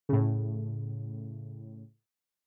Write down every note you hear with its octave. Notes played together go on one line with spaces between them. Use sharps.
A2 C#3